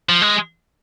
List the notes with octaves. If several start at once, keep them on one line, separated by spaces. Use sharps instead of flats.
F3
G#3